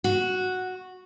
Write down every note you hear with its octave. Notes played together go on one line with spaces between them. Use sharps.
F#4